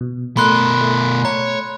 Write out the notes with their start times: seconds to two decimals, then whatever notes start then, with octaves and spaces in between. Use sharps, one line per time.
0.01 B2
0.37 B2 A3 A#4 B5 C6 F#6
0.81 A3
1.25 C#5 A#5